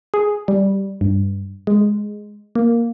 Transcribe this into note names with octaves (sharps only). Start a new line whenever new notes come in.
G#4
G3
G2
G#3
A#3